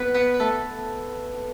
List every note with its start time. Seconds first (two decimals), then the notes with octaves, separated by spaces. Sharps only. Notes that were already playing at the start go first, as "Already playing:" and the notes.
Already playing: B3 B4
0.14 B3 B4
0.34 B4
0.40 A3 A4